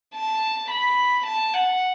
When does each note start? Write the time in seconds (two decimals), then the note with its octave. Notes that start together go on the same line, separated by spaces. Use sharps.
0.14 A5
0.70 B5
1.26 A5
1.54 F#5